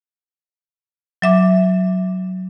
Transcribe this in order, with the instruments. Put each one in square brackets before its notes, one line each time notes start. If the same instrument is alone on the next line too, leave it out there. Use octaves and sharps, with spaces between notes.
[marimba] F#3 E5 D6